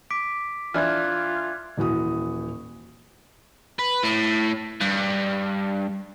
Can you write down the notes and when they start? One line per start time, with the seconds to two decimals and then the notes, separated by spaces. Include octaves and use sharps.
0.11 D6 B6 D7
0.74 E3 D4 F4 F6 F#6 G#6
1.77 D#1 E3 F#4 D#6
3.79 B4
4.03 A2
4.81 G2